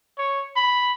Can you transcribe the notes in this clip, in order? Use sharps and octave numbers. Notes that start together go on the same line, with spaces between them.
C#5
B5